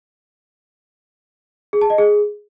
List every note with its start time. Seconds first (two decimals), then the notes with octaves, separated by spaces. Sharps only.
1.73 G#4
1.81 A5
1.90 D#5
1.98 G#4